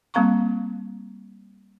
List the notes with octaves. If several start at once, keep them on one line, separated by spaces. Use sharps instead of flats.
G3 A#3 C4 F5 A#5 C#6